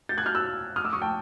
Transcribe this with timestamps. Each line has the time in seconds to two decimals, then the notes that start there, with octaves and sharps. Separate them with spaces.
0.09 G6 A6
0.18 F#6 G#6
0.26 F6 G6
0.35 E6 F#6
0.76 D#6 F6
0.84 D6 E6
0.93 C#6 D#6
1.02 G5 A5